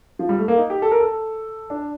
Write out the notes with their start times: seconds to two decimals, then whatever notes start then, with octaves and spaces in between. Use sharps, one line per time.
0.19 F3
0.29 G3
0.39 A3
0.48 A#3
0.57 D#4
0.70 G4
0.82 A4
0.91 A#4
1.00 A4
1.70 D4